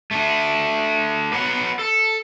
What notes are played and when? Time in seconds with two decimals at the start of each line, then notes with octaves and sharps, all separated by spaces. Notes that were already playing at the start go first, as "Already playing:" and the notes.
0.11 A3 D4
1.33 B4 C#5 F#5
1.79 A4